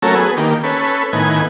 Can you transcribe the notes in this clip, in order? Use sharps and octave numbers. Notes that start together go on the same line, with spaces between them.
F#3 A3 C#4 A4 A#4
B3 G#4
D#3 A#3 G4
C#4 A4 B4
A2 D#3 B3 G#5